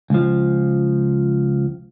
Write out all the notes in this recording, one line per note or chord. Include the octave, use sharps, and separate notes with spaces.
C#2 F3